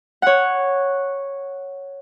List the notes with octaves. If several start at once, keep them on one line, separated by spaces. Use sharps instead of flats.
C#5 F#5